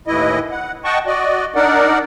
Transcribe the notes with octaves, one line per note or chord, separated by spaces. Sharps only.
D#2 A2 E3 E4 D#5
F#5
D#5 F#5 G5 A5 C#6
F#4 D5 D#5
D4 D#4 A#4 D5 F#5